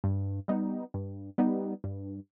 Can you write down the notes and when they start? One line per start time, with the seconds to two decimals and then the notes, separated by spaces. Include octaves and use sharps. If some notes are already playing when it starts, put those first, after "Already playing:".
0.04 G2
0.48 G3 B3 D#4
0.94 G2
1.38 G3 B3 D#4
1.84 G2